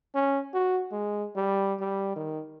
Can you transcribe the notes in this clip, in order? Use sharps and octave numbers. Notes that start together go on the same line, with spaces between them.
C#4
F#4
G#3
G3
G3
D#3